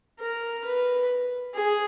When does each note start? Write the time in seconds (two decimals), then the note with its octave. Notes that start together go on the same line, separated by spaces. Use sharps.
0.20 A#4
0.65 B4
1.55 G#4